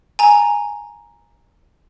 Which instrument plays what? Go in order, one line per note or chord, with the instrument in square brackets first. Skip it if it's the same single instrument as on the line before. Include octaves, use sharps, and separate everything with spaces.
[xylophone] G#5 A#5